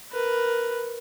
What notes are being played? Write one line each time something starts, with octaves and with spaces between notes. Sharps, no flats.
A#4 B4